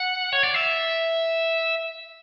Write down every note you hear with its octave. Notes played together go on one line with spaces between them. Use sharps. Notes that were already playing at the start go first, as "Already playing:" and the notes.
Already playing: F#5
C#5
D5
E5